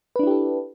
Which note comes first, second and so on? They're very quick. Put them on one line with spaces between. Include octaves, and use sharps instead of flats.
B4 D4 E4 G4 A4